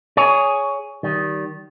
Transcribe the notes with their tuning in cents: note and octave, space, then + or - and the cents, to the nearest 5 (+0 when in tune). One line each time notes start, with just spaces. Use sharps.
G#4 +0 C#5 +15
D#3 +0 G3 -30